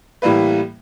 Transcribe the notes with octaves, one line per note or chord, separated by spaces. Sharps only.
A2 E3 G3 A#3 B4